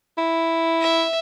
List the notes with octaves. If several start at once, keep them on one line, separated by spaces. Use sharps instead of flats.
E4
E5